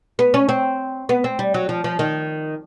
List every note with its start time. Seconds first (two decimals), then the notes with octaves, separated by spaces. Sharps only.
0.19 B3
0.34 C#4
0.49 C4
1.09 B3
1.24 C4
1.39 G3
1.54 F#3
1.69 F3
1.84 F3
1.99 D#3